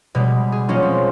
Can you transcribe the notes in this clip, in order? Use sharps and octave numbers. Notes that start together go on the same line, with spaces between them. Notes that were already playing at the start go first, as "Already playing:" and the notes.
B2 G3 G#3
G#4
F#3 G#3 A#3 C#4 F4
C4